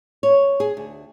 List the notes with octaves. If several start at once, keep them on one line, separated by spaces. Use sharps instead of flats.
C#5
G#4
D2